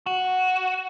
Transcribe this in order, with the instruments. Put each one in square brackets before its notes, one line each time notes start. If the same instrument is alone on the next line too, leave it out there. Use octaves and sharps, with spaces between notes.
[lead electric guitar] F#4